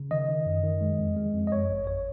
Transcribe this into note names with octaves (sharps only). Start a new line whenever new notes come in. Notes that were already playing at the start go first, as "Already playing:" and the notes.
Already playing: C#3
D#3 D#5
D#3
F#2
D#3
G#3
F2
G#3
F2
D#5
F#2 C#5
G#1
G#1 C#5